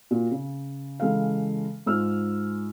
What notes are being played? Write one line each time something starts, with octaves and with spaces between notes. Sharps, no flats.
A#2 F#4
C#3
C#3 E3 G#3 A4 F5
G#2 F4 E6 F6